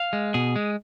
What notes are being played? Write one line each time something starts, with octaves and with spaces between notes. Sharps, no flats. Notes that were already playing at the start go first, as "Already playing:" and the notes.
Already playing: F5
G#3
B2 G#4
G#3